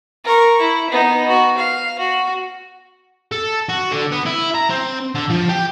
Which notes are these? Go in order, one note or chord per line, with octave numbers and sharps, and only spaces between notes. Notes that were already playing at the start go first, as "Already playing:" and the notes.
A#4 C#6
E4
B3 D#4
F#4
F5
F#4
A4
F#4
D3
B3
E4
A#5
C4
D3
F3
G4